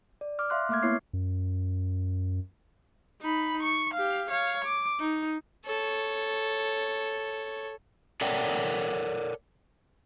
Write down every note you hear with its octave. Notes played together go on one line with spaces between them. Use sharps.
D5
D6 F6
E5 F5 C6 F#6
A3 A#3 E5 D6 F6 G#6
A#3 B3 E4 C#5 C#6 C7
F#2
D#4 B5
C#6
G4 F5
C#5 F5
D6
D#4
A4 C#5
A4 A#4 C#5 D5 F#5 G5